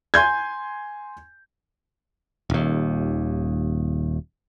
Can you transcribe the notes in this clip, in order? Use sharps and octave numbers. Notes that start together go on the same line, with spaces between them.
G#5 C6 G6 G#6
D#1 D#2